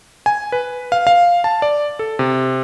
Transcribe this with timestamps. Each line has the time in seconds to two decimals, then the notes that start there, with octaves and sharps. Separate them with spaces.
0.26 G#5
0.52 B4
0.92 F5
1.07 F5
1.44 A5
1.62 D5
1.99 A4
2.19 C3